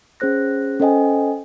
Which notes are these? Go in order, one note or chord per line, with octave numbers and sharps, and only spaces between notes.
C#4 G#4 C5 F#6 A#6
C#4 A4 C5 D#5 G5 G#5